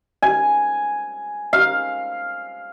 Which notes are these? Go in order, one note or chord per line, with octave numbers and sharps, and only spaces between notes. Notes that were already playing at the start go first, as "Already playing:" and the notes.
G#5
F5